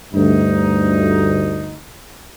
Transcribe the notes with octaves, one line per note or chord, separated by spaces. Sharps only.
D2 G2 D#4